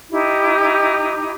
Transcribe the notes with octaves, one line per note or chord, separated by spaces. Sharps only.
D#4 E4 G4